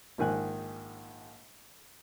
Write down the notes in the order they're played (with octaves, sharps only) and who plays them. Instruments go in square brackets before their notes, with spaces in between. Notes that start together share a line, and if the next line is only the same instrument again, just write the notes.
[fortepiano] A#1 G#2 D#3 G#5 F#6